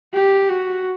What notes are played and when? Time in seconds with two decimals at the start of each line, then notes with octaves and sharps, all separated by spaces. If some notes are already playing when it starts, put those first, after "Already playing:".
0.14 G4
0.49 F#4